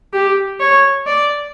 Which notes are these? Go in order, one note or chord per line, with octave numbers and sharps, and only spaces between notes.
G4
C#5
D5